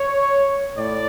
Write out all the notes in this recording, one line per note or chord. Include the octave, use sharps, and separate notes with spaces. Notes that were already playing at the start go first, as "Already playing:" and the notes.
Already playing: C#5
A2 D5